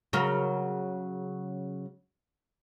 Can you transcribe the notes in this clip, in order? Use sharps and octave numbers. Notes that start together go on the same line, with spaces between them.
C#3 F#3 A#4